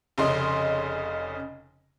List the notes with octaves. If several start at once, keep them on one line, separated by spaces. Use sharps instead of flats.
F1 C#3 D#5 C6